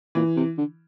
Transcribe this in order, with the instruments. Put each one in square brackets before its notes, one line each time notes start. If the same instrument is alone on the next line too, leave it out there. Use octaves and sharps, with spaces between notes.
[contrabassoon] A#2 [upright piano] E3
[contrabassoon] C3
D3